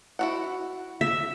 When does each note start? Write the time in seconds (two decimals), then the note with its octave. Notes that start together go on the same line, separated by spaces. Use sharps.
0.19 E4 F#4 F#5
1.01 E5